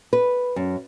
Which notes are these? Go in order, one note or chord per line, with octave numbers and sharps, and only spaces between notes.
B4
F#2